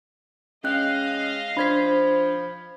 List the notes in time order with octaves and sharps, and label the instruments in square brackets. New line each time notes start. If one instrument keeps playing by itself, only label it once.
[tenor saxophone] G#3 [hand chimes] C#4 F#6 [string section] D#5 F5
[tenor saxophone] F3 [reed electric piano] D4 C5 [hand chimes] B5 G#6 B6